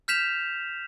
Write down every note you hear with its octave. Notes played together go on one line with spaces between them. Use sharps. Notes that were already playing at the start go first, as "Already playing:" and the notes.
F6 G6 B6 E7 F7